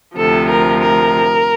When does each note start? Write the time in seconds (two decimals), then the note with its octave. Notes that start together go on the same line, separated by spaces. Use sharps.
0.17 D2 C3 F3 A4
0.49 A#4
0.81 A#4